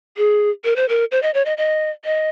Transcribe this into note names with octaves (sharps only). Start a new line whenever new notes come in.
G#4
A#4
C5
A#4
C5
D#5
C#5
D#5
D#5
D#5